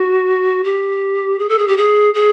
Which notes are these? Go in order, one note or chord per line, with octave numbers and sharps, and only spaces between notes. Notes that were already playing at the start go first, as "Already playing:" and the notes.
Already playing: F#4
G4
G#4
A4
G#4
G4
G#4
G#4